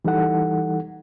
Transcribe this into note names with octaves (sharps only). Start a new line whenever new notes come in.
E3 G3 D#4 A4 F#5